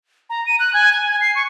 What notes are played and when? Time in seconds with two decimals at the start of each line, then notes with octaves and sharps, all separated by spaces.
0.30 A#5
0.47 D#7
0.59 F#6
0.74 G#5
0.93 G#6
1.10 G#5
1.21 C7
1.35 C#6